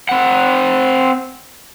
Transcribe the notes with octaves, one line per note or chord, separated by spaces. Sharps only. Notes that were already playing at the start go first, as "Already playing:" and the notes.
C4 F#5